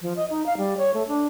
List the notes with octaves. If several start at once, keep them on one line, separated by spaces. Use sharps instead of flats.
F3
D#5
D#4
F5
G3
C#5
A3
D4